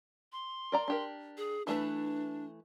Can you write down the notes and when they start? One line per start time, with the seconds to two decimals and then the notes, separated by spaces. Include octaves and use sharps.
0.32 C6
0.72 A#4 D5 A#5
0.88 D4 G4 A#4
1.37 G#4
1.67 E3 A3 D4 B4